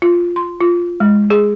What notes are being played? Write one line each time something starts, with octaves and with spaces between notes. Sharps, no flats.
F4
C6
F4
G#3
G#4